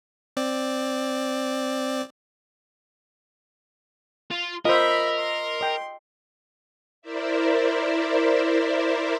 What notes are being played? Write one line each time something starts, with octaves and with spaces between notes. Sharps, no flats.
C4 D5
F4
F4 A#4 C5 D#5 E5 B5
C6
D#5 G5
E4 A#4 C5 D5 E5